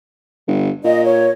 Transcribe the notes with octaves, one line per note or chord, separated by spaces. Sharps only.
G1
A#2 D#5
C#5